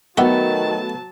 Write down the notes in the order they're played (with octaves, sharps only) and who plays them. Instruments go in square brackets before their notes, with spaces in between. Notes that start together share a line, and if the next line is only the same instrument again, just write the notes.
[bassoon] D#3 [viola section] F#3 A5 [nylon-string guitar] A3 B3 [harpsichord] F#4 G4 E5